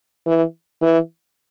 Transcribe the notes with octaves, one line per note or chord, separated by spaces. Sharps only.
E3
E3